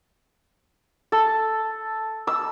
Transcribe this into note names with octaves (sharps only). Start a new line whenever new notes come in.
A4
E6